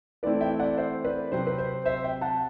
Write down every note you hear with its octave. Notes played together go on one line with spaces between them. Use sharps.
E3 A3 C4 E4 B4 D5
E5 G5
D5 F#5
C5 E5
B4 D5
C3 F#3 C4 C5
B4
C5
C5 E5
E5 G5
F#5 A5